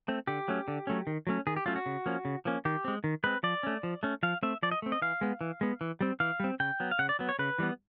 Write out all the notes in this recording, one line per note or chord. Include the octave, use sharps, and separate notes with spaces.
A3 C4
D3 G4
F#3 A3 C#4
D3
F#3 A3 C#4
D#3
F#3 A3 C#4
D#3 G#4
G4
F#3 A3 C#4 F4
F#4
C#3
F3 A#3 C#4
C#3
F3 A#3 C#4
D#3 G4
G#3 C4
D#3
G#3 C4 B4
F3 D5
A3 C#4
F3
A3 C#4
F3 F5
A3 C4 E5
F3 D5
D#5
A3 C4
D#5
E3 F5
G#3 B3
E3
G#3 B3
E3
G3 C4
E3 F5
G3 C4
C#3 G5
F#3 B3
F5
C#3 F#5
D5
F#3 B3
C#5
C#3 B4
E3 G3 B3